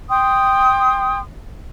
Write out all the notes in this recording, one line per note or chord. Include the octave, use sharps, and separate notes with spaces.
G5 C6 D#6